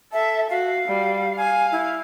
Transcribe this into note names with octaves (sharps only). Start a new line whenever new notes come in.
A4 E5
F#4 F5
G3
F5 G#5
E4